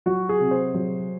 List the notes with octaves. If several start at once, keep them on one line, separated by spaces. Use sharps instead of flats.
F#3 F#4
G#4
C3
C5
F#3